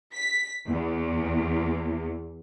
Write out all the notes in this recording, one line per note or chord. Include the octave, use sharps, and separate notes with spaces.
B6
E2